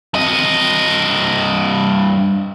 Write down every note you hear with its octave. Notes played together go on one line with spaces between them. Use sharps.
G2 D#5